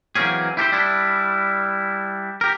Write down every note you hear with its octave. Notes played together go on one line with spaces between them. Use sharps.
E3 F#3 A#3 C4 C#4 G#4
E4 G4 A4 C5
G3 D4 E4
G4 A#4